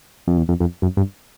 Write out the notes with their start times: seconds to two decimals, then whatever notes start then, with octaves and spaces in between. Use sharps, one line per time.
0.27 F2
0.38 E2
0.49 F2
0.60 F2
0.82 F#2
0.97 G2